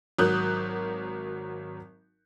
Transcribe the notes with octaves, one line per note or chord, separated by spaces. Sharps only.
G#1 F#3 A#4 D#6 F#6 G6